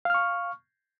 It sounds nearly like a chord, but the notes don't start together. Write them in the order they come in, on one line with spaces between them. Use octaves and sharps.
F5 F6 C#6